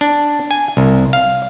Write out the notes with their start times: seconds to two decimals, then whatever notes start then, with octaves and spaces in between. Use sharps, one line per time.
0.01 D4
0.51 G#5
0.77 C2
1.13 F5